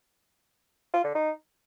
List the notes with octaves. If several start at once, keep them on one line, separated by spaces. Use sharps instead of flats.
F4
D3
D#4